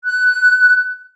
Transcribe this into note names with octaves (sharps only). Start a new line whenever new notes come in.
F#6